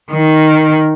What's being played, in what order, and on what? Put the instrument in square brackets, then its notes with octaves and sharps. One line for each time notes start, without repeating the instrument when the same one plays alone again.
[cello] D#3